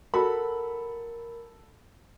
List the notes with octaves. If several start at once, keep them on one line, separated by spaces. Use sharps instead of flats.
F#4 A4 A#4 B5